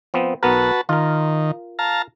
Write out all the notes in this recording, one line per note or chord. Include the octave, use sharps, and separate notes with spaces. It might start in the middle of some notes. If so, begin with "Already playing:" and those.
F3 B3 C4
B1 B3 F#4 A#4 B4 A5
D#3 F4 A#4
F5 A5 A#5